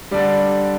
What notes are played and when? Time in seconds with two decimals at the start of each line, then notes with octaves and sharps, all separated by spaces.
0.11 D3 G3 D5